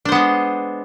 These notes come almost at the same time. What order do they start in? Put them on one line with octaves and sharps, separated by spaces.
D4 C5 B3 G#3